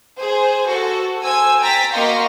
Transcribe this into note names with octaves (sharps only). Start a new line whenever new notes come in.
G#4 C5
F#4 A4
C5 G#5 E6
G5 A#5 A6 B6
A#3 F#4 D#5 F5 C6 C#6